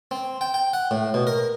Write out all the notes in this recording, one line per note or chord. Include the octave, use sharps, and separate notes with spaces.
C4
G5
G5
F#5
A2
B2
A#4